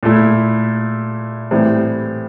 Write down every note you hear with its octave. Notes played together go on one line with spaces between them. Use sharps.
A#2 A3 E4
A2 E3 G3 C4